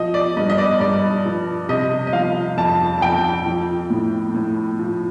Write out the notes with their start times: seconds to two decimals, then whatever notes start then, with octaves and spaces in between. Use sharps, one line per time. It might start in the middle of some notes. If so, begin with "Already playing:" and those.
Already playing: F3 D#5
0.14 D5
0.37 G2 D#5
0.50 D#5
0.58 D5
0.80 G2 D5
1.25 F3
1.69 C3 D#5
2.07 D#5
2.13 F3 F5
2.58 F2 A5
2.98 A5
3.02 F2 G5
3.46 F3
3.90 A2
4.34 A2
4.79 F3